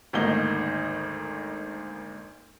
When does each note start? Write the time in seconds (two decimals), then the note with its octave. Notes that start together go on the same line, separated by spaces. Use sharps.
0.13 G#1 D2 D#3 A#3 D#5 G7